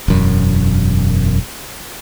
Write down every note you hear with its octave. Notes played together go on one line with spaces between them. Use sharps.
E1 F#2